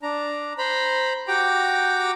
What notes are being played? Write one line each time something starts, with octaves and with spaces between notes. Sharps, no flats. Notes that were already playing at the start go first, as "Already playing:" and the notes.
D4 A#5
C5 A#5 B5
F#4 G4 G5 A#5 D6